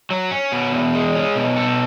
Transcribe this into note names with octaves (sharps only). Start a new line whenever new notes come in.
F#3
C#4
B2
E2
G#3
C#4
B2
A4